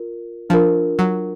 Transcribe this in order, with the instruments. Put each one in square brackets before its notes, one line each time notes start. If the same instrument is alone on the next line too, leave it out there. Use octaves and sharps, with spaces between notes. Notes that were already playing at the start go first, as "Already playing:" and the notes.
Already playing: [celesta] F4 A#4
[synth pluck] F3 [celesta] D4 F4 A#4
[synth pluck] F#3